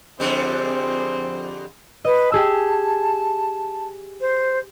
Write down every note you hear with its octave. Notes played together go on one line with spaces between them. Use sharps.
F2 D3 G3 C4 G#4 C6
B4 D#5
G4 G#4 A5 E6
C5